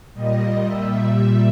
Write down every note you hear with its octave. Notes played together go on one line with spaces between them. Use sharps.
A#2 G3 D#5
A#2 G3 E5
A#2 G3